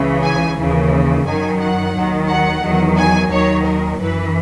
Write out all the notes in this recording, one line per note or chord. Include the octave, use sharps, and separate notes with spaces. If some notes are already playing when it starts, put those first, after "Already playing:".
Already playing: C#2 C#3 E3
G#5
D#2 C#3 E3
F#2 D#3 F#3 G#5
F#5
D#2 D#3 F#3
F#5
E2 D#3 F#3
G#5
D#2 D#3 F#3 C#5
A#4
F#2 E3 B4